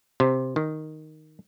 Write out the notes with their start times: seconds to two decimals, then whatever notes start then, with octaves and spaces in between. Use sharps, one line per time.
0.20 C3
0.56 D#3